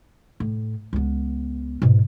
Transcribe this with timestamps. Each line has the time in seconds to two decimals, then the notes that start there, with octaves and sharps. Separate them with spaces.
0.40 A2
0.93 C#2 B3
1.82 G#2 B2